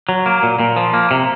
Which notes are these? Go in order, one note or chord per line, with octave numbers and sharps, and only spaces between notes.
F#3
A#3
A#2
A#2
F3
A#3
C3